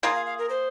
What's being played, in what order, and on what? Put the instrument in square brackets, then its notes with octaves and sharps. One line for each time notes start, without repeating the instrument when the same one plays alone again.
[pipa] A#3 F4 G#4 [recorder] A#5
[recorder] F5
F5
A#4
C5